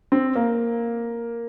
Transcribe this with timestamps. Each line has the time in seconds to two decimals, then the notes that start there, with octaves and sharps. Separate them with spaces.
0.12 C4
0.36 A#3